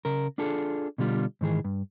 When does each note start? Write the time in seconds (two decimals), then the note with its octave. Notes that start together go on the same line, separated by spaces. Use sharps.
0.05 C#3 A#4
0.38 D4 F4 G#4 A4
0.98 B2 D3 G3 F4
1.41 G#2 D#3 E3 G#4
1.64 G2